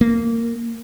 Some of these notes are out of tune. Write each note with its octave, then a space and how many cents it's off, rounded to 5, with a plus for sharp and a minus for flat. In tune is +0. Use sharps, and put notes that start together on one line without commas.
A#3 -15